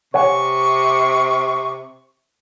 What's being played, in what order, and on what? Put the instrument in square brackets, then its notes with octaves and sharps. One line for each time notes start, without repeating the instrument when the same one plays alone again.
[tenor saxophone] C3 [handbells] C#5 F#5 G#5 [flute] C#6